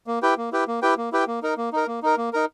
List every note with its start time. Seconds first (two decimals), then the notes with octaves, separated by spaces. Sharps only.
0.07 A#3
0.22 E4 G4 B4 G5
0.37 A#3
0.52 E4 G4 B4 G5
0.68 A#3
0.82 E4 G4 B4 G5
0.97 A#3
1.12 E4 G4 B4 G5
1.27 A#3
1.43 D#4 A#4
1.57 A#3
1.73 D#4 A#4
1.88 A#3
2.03 D#4 A#4
2.17 A#3
2.33 D#4 A#4